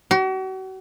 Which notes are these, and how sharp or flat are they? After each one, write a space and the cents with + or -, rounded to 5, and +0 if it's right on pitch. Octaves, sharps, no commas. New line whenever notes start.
F#4 +40